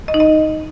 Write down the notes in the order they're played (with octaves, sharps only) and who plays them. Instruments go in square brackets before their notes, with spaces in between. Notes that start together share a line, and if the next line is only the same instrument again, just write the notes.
[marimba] D#5
D#4
D#5